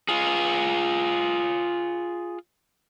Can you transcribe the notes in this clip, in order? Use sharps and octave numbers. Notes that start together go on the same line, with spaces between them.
F4 G#4